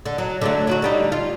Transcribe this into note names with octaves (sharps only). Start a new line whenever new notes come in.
D3
F#3
D3 F#3 A3
F#3 E4 F#4
D3 G3 D#4
F4